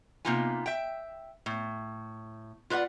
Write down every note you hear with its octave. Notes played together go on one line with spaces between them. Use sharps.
C3 A#3 B3 D#4 F4 G#5
E5 G5
A2
F4 B4 D5 F5 F#5